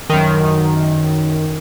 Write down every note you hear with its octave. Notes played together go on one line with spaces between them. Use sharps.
F#2 D#3